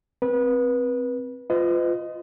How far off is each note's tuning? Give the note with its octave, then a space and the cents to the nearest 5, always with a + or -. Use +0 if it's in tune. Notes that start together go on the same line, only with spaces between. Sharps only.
C4 +0 B4 -25
F4 +0 B4 +45 D#5 +0